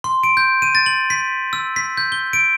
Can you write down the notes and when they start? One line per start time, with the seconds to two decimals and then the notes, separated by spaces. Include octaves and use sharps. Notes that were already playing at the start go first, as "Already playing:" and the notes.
0.04 C6
0.23 D7
0.37 G6
0.62 D#7
0.75 A6
0.86 F#7
1.10 B6
1.53 E6
1.76 B6
1.97 G6
2.12 G7
2.33 D7